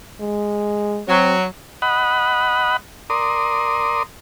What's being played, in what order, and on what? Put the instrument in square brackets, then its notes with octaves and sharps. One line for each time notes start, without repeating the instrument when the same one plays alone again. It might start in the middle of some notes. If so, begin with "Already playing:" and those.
[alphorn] G#3
[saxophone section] F#3 [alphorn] C4
[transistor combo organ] D#5 F#5 B5
A#4 D5 C6 D#6